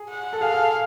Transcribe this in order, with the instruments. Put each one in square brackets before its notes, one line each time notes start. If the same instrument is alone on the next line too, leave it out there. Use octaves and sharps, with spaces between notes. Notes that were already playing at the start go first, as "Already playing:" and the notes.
Already playing: [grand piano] G#4
[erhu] F#5
[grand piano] A4
[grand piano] G#4 [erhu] F5
[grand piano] A4